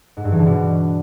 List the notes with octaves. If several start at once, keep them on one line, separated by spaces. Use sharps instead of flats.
G#2
G2
E3
D3
B2